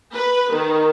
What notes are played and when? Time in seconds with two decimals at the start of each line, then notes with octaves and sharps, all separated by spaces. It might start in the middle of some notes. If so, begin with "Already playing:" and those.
0.15 B4
0.53 D#3